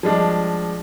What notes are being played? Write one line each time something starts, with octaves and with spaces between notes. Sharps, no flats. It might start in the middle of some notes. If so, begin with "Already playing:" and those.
F3 G3 G#3 D4